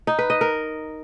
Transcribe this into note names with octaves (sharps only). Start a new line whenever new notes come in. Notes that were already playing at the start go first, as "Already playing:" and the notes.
D#4
B4
D#5
A#4